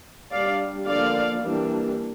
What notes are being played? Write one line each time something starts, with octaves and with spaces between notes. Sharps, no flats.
G3 D4 D5 F5
D3 F3 A#3 D5 F5
E3 G3 A#3 D4